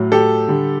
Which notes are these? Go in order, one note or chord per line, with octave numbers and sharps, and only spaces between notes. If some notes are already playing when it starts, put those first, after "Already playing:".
Already playing: A2 F#3
G4 A4
D3 G3